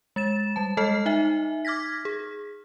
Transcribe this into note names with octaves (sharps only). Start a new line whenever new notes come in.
G#3 A6 E7
G3 A5
G#3 A4 D#5 A5 F6 C7
D#4 E5 G#5
D6 F6 G#6 A#6 B6
G#4